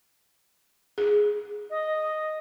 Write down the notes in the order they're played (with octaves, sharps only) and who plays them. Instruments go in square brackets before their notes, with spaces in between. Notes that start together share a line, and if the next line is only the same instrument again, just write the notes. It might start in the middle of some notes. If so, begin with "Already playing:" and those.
[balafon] G#4
[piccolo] D#5